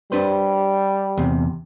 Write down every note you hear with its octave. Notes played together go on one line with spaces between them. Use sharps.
G3 D4 B4 C5
E2 C3